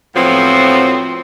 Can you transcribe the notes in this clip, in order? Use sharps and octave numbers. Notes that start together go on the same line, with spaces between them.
A2 F3 F#3 B3 C4